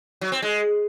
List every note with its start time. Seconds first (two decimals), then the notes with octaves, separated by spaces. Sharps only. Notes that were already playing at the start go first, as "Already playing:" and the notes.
0.21 F#3
0.32 C4
0.42 G#3